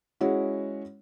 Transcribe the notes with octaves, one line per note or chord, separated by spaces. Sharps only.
G#3 C#4 E4 F#4